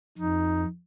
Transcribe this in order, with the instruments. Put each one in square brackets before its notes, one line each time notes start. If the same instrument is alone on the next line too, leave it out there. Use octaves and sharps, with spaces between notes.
[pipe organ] F2 [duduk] D#4